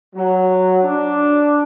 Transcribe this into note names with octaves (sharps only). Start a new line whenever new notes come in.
F#3
D4